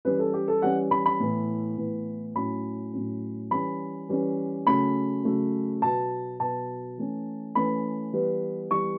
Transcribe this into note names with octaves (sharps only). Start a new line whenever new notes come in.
E3 G3 C#4 B4
A4
G4
A4
E3 G3 C#4 F#5
B5
B5
A2 E3 B3
A2 E3 B3
A2 F#3 C#4 B5
A2 F#3 C#4
E3 G3 C#4 B5
E3 G3 C#4
C#3 F#3 A3 C#4 B5
C#3 F#3 A3 C#4
B2 F#3 B3 A5
B2 F#3 B3 A5
E3 A3 C#4
E3 A3 C#4 B5
E3 G3 B3
E3 G3 B3 C#6